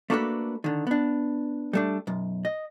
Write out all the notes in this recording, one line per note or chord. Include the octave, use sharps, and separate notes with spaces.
A3 A#3 D4 F#4 A4 B4
D3 D#3
B3 D4
G3 A3 D4
B1 F#2
D#5